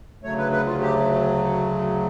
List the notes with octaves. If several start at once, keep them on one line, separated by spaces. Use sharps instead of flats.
D2 C#3 F#3 A3 C#5
B4
B4
F4
G4